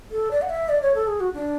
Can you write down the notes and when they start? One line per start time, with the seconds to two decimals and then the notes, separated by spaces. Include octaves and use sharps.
0.11 A4
0.31 D5
0.42 F#5
0.49 E5
0.69 D5
0.82 C#5
0.95 A4
1.07 G#4
1.20 F#4
1.34 D4